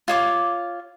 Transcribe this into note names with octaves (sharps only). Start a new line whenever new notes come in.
F4 C#5 D6